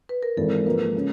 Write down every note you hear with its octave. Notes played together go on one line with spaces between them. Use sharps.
B4
A#4
G#1 G#2 E3 A4
A#4
G#2 F3 A#3 B4
C#3